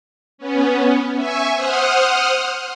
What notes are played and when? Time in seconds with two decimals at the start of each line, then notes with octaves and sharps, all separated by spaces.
0.38 B3 C#4
1.16 E5 G#5 C#6
1.55 C5 F#5 D#6 F6